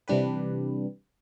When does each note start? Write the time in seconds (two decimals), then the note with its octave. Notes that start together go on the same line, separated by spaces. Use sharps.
0.08 C3 E3 G3 D4 G4 B4